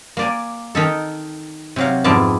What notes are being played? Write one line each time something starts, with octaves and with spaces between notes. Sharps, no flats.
A#3 D5 G#5
D#3 D#4 A4
C3 F#3 F5
F2 G#2 B3 E4 D5 A5